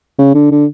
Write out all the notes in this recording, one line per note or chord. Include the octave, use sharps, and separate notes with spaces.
C#3
D3
D3